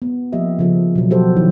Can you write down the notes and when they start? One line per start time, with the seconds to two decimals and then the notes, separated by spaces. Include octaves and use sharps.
0.02 B3
0.32 F3 A#3 G4 D#5 E5
0.59 C#3 F3 A4
0.95 B2 F#3
1.10 F3 F#3 F#4 G4 A4 C5
1.37 D#3 F3 E4